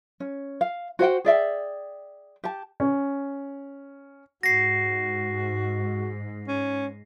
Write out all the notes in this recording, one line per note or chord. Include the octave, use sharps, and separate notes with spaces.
C#4
F5
F#4 C5 F#5 G5
G#4 D5 E5 G5
G4 A5
C#4
G#2 F#4 A#6 C7
C#4